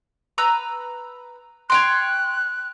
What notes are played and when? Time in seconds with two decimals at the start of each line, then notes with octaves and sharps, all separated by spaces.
0.38 B4 A#5 E6
1.70 C#5 G5 C6 F#6